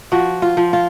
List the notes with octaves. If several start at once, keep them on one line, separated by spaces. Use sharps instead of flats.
F3 F#4
F4
F3
F4